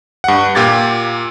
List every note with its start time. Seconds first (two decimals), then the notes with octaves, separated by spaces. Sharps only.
0.24 G2 F#5
0.55 A#2 F4 G4 D6 G#6 A6